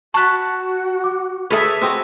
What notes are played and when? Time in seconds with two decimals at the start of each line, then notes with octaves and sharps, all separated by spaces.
0.14 F#4 A5 B5 C#6 F#6
1.04 D6
1.50 G#4 A4 B4 C#5 E5
1.81 C4 F#4 D#5